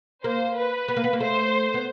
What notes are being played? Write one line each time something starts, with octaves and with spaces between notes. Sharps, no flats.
A#3 C5
B4
B3
A#3
B3
A#3
A3 C5
B3